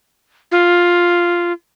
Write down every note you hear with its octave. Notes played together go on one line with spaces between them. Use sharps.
F4